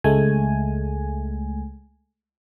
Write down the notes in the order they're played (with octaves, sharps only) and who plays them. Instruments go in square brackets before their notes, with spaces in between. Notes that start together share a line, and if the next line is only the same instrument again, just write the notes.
[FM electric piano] C#2 G#3 A3 G#5